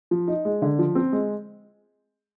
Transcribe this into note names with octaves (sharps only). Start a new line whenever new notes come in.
F3
D#4
G#3
D3
F3
C4
G#3